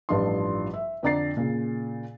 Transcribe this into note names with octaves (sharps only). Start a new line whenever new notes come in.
A1 G2 F3 D4 F4 C6
E5
F2 D3 D5 A#5 A6 C7
A#2 C#3